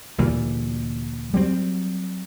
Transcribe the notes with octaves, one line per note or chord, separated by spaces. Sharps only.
D2 A#2 E3 G3
F#3 G3 B3 C4